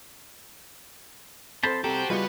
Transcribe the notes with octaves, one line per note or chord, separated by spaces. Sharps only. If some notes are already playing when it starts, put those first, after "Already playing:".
C4 A4 C5 A5 B5 C6 G6
C2 C4 F#4 G4 A4 C5 A5 A#5
C#2 G3 B3 F4 F#4 G#4 B4 D#5